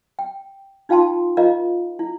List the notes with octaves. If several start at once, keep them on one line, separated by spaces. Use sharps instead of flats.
G5
D#4 F4 F5 G5 A5 C6
F4 A#4 D#5 F5 A#5
E4